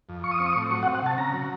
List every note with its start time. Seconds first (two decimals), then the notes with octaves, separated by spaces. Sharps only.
0.09 F2
0.24 F3 C#6
0.31 D#6
0.39 C4 C#6
0.46 D#6
0.53 C#6
0.56 A2
0.71 F#3 C#6
0.83 F#5
0.87 C4
0.95 F#5
1.02 C3 A5
1.18 C#3 A#5
1.33 F#3